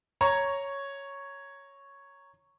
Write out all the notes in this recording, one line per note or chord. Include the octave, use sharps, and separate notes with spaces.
C#5 A#5 C#6